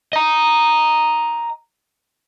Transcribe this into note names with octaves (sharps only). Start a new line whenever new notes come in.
D#5 A#5